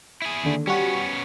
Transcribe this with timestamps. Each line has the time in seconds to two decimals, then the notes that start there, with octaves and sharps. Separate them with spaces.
0.22 E4 G#4
0.44 D#2 D3
0.67 G3 B3 C#4 F#4